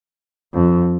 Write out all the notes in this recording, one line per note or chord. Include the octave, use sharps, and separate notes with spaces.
F2